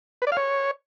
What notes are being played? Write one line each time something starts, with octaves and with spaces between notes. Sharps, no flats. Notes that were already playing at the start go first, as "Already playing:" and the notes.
B4
D5
F5
C#5